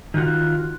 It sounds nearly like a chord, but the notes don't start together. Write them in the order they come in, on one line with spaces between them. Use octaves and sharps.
D#3 F#4 F4